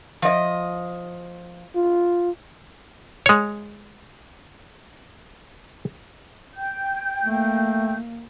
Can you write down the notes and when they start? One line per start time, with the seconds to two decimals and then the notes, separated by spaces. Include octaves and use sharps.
0.22 F3 D#5
1.76 F4
3.26 G#3 C#5
6.54 G5 G6
7.24 A3 A#3